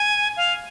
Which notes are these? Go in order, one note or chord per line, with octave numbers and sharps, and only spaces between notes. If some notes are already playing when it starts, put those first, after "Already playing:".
Already playing: G#5
F5